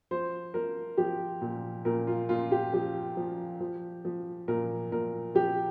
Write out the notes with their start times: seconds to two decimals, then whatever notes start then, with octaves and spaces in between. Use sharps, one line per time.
0.11 F3 C5
0.54 F3 A#4
0.97 F3 G4
1.41 A#2
1.85 A#2 A#4
2.07 F4
2.29 A#2 F4
2.52 G4
2.73 F3 G4
3.17 F3
3.60 F3
4.05 F3
4.48 A#2 A#4
4.92 A#2 A#4
5.35 F3 G4